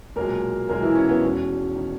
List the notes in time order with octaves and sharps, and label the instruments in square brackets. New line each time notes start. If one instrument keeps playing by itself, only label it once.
[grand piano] B1 A#2 G#3 A#3 A#4
B1 A#2 G#3 A#3 A#4
E3 E4
C#4
B3
E1 E2 D#3 C#4
D#3